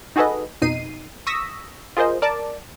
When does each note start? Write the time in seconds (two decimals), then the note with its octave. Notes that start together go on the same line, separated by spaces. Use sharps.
0.16 D#4 F#4 G#4 A4 B4 D#5
0.62 F2 B2 D#4 C7 D#7
1.27 C#6 D#6 E6 A#6 B6
1.97 F4 G#4 A#4 C5 D#5
2.22 A#4 D5 A5 D6